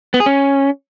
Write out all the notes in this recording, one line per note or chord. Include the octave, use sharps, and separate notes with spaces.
B3
G#4
C#4